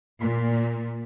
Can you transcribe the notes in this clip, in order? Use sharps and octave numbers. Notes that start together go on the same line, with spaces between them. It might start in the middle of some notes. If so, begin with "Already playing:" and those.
A#2